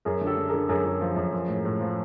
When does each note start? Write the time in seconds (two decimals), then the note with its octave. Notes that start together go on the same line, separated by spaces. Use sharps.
0.05 F#2 G#4 A#4
0.21 D3
0.27 G4 A4
0.37 D3
0.48 G#4 A#4
0.54 D3
0.69 F#2 G#4 A#4
0.85 F#2
1.01 F3
1.16 F#2
1.33 F3
1.48 A2
1.65 A2
1.81 F3